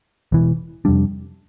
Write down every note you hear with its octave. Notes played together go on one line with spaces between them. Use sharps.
E1 E2 E3
F2 C3 G3 D4